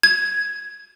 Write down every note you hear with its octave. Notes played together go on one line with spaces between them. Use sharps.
G#6